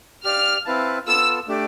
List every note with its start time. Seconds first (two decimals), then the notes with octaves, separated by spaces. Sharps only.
0.24 G4 D5 F5 F6
0.65 C4 E4 B4 F5 A5
1.06 B3 F4 A4 E6
1.48 A3 D4 G4 D5